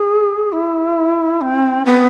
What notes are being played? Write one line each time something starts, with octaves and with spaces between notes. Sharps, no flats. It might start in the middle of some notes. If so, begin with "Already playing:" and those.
Already playing: G#4
E4
C4
B3